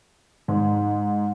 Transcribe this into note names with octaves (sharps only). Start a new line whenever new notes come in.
G#2